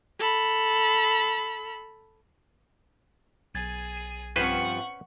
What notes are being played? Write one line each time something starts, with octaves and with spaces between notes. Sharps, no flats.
A4 B5
B1 G#4 G#6 A6 D#7
G2 F3 C4 C#4 B4 C5 F#5 C#6